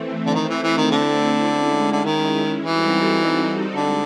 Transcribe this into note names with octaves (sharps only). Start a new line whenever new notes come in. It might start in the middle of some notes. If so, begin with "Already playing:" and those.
Already playing: E3 A3 C4
D3
D#3 A3 C4 E4
E3
E3
D#3
D3
G#3 C#4 E4
D3
D#3
E3 G3 C4 D#4 F#4 A4
D3 G#3